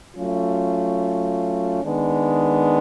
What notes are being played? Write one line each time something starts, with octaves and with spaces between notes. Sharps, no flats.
F#3 A3 C#4 F4
D#3 G#3 B3 D4